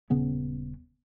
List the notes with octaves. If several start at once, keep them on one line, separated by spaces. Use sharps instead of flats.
D#1 C#3 B3 C#4